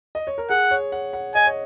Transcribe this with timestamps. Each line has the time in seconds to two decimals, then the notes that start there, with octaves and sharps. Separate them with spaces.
0.15 D#5
0.27 C#5
0.38 A#4
0.50 G#4 F#5
0.71 C#5
0.92 F#5
1.13 F#5
1.35 D#5 G#5
1.46 C#5